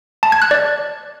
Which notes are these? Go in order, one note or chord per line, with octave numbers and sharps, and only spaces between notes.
A5
G#6
F#6
D5